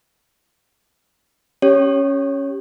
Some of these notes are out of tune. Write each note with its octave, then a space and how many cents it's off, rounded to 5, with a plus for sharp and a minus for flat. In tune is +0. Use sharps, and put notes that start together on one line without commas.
C#4 +0 G4 +0 C#5 +0